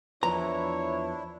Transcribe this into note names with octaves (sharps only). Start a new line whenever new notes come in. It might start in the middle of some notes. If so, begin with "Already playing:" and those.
E2 F3 D4 E4 B4 C#5 A#5